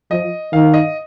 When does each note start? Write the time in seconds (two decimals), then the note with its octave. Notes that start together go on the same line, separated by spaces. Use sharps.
0.11 F3 D#5
0.53 D#3 F5
0.74 D#5